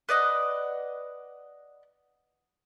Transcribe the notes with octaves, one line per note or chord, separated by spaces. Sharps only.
B4 D5 D#5 F#5